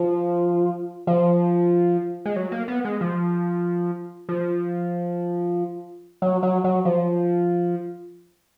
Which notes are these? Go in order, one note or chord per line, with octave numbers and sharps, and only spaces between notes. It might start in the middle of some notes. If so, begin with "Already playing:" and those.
Already playing: F3
F3
G#3
F#3
A#3
B3
G#3
F3
F3
F#3
F#3
F#3
F3